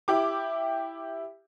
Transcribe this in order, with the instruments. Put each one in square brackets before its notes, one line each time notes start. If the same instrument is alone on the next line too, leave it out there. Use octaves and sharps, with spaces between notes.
[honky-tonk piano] E4 G4 D6